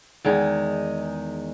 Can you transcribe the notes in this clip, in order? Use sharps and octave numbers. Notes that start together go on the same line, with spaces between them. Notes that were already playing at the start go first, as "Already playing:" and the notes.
E2 D#3 G#3 D#4